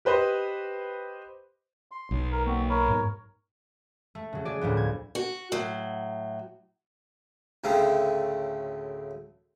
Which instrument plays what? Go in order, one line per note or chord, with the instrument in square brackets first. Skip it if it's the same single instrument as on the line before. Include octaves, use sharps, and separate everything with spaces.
[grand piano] G4 B4 C5 D#5
[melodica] C6
[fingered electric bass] B1
[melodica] A#4
[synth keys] A#3 [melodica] C4 F#4
[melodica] A#4 C#5 [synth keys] B5
[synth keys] G#2
[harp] A3
C#3 F#3
F#3 G#4 D5
D2 A2 F3 B3
G#6
[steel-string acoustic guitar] F#4
A2 F#3
[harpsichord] D2 A2 C#3 C4